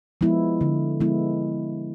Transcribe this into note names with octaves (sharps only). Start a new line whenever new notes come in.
F3 G#3 B3 E4
D3
F3 G#3 B3 E4